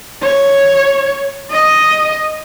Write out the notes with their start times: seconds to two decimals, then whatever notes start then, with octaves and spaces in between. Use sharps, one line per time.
0.23 C#5
1.50 D#5